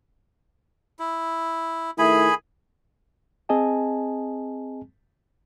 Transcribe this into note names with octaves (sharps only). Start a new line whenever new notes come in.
E4
D#3 A3 E4 G#4 G#5 B5
C4 G#4 D#5 G#5 A5